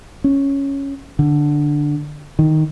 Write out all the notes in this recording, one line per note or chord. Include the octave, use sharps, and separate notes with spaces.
C#4
D3
D#3